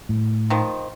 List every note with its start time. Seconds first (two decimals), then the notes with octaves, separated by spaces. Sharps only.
0.09 A2
0.50 D#3 F3